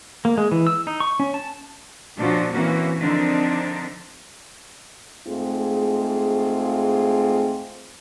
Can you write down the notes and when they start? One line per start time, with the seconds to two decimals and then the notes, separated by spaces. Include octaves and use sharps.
0.25 A#3
0.38 G#3
0.52 E3
0.67 E6
0.87 D#4
1.00 C#6
1.20 C#4
1.34 A5
2.18 A#2 F3 C#4 D4 F4 F#4
2.52 E3 A#3 C4 C#4 F#4
2.99 D3 F3 C4 D4 D#4 A#4
5.27 G#2 A3 C4 F4 G#4